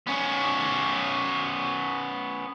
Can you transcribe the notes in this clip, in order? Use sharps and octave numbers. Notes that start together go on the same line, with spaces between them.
B3 C#4